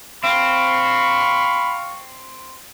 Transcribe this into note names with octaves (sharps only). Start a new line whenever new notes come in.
C4 F5 B5 C#6